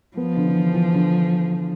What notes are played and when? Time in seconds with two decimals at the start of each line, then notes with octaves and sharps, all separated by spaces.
0.17 F3 B3
0.36 D3
0.47 D3
0.55 E3
0.73 E3
0.93 D3